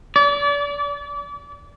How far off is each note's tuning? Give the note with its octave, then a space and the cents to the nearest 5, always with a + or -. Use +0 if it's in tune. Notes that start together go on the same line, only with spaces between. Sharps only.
D5 -35